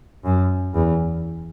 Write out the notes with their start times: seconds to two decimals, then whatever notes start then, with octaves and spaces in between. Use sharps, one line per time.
0.25 F#2
0.74 E2